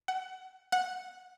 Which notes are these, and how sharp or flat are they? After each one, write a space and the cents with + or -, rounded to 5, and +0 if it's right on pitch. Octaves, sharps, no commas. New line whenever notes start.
F#5 +20
F#5 -10